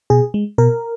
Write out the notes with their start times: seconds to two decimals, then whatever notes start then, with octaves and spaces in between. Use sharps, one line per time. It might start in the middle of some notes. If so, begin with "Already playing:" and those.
0.10 B2 G#4
0.34 G#3
0.58 B2 A#4